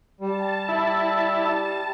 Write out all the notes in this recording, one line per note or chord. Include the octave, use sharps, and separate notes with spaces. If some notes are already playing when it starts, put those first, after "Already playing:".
G3 A5
E4